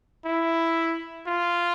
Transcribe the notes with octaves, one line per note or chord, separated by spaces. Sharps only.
E4
F4